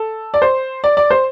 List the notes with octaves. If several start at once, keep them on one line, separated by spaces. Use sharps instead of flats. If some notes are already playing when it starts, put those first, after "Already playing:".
Already playing: A4
D5
C5
D5
D5
C5